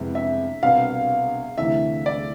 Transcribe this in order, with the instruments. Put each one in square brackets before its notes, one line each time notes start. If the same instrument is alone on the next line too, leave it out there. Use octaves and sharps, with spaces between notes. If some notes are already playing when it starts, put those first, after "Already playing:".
Already playing: [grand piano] F2 C3 G#3 B3 E4
[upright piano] E5
[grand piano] C2 B2 B3 D4 [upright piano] F5
[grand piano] D2 C3 E3 A3 [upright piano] E5
[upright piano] D5